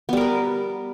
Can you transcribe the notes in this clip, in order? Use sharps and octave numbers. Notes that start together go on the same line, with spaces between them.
G3 B3 A#4 B4